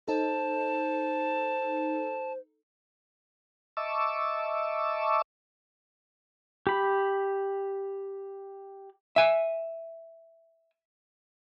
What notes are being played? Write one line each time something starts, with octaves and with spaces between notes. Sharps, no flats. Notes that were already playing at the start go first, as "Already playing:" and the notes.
D#4 A4 C5 A5
D#5 E5 A5 C#6 D6 E6
G4 B5
E5 G#5